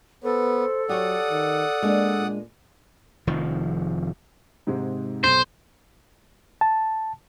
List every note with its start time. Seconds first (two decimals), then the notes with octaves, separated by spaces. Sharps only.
0.24 B3 A4 C5
0.89 F#3 G4 C#5 D5 F#5 D#6
1.30 D#3
1.82 G#3 A#3 D4
2.18 A#2
3.27 F1 D#3 F3
4.67 G#2 C3 G#3
5.24 B1 C5
6.61 A5